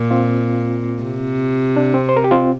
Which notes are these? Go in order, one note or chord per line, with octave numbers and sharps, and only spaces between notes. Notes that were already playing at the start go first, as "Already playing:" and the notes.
Already playing: A#2
C4 F4
C3
D4
C4
C5
A#4
G4
C4 F4